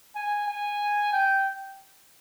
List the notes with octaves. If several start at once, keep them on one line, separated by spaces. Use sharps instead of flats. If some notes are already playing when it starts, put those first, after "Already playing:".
G#5
G#5
G5